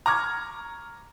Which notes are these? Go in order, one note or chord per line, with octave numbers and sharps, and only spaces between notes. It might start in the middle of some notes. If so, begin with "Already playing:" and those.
A#5 C#6 D6 F6 G#6